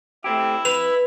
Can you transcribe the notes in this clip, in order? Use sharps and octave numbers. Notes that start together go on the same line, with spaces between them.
A3 C4 E4 G4
F2 B4 F7